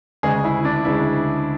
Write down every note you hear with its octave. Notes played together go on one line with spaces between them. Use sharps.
D2 C#3 G#3 G#4
E4
D4
D2 C#3 G#3 E4